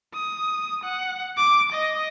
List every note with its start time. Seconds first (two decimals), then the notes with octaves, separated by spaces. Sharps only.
0.14 D#6
0.84 F#5
1.37 D6
1.73 D#5